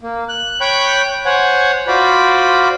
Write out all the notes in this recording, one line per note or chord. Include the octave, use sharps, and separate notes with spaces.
A#3
F#6
C#5 G5 B5 C#6 F#6 G6
C5 C#5 F#5 G#5
F4 F#4 C5 D5 B5